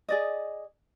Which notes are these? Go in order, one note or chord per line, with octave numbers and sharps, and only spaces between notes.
G#4 D5 D#5